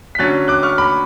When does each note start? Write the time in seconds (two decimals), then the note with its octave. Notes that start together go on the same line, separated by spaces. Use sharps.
0.15 B6
0.19 D3 F#3 C#4 F#6 A6
0.48 D6 F#6
0.63 C#6 F6
0.78 B5 D6